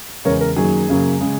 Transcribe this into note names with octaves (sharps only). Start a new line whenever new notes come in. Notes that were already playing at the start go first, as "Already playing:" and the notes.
E2 C#3 G#3 A#4 C#5
A#4
F#2 D#3 F#3 A#3 G#4
F#2 C#3 F#3 A#3
C#3 G#3